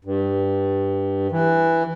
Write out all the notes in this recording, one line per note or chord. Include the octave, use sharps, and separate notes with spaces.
G2
E3